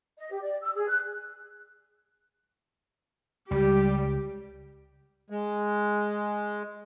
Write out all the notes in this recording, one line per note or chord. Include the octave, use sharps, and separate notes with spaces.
D#5
G4
D5
E6
G#4
F#6
C#2 G3 G4
G#3